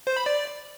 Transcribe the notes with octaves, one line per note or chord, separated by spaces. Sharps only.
C5
B5
D5